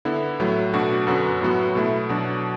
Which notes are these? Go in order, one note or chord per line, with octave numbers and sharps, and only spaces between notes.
D3 B3 E4
A2 F#3 A3
B2 A3 D4 F#4
F#2 D3 B3 F#4
A2 F#3 B3 F#4
B2 A3 E4
B2 F#3 D4 F#4